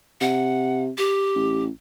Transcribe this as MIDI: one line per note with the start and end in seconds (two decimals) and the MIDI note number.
0.21 0.91 48
0.21 0.82 78
0.98 1.63 67
1.35 1.69 33